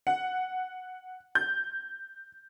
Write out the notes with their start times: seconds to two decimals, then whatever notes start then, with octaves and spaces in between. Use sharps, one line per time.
0.07 F#5
1.35 G6